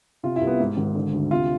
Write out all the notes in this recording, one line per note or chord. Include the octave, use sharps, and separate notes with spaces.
C3 F4
C2 E4
B3
G#2
G#1
D3
D2
C3 F4